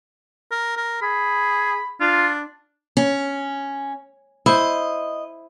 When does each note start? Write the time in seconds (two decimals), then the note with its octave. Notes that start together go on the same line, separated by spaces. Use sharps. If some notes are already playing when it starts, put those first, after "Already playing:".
0.52 A#4
0.77 A#4
1.02 G#4 B5
2.01 D4 F4
2.97 C#4
4.46 E4 C5 D#5